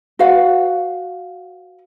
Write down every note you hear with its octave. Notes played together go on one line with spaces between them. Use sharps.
F#4 B4 F5 F#5